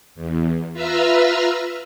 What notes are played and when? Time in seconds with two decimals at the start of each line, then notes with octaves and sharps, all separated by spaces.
0.15 E2
0.73 F4 B4 E5 A#5 E6 F6